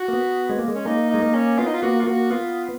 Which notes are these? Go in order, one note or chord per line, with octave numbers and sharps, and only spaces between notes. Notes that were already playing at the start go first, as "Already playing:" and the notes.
Already playing: F#4
A#3
B3
G#3
A#3
G#3
C#4
A#3 D#4
G#3 D#4
A#3
C#4
B3 F4
D#4
F4
A#3 F#4
F4
A#3 F#4
B3 F4